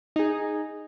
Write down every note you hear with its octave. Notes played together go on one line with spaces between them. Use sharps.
D#4 G#4